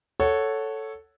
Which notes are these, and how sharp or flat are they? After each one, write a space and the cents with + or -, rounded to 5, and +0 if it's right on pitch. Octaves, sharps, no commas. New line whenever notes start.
A4 +0 C#5 +0 F#5 +0